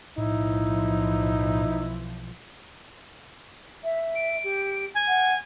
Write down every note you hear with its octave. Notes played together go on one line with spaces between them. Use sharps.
B1 A2 E3 F3 D#4 E4
E5
D7
G4
G#5
F#5